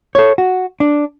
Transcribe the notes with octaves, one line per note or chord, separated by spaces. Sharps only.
A4 C#5
F#4
D4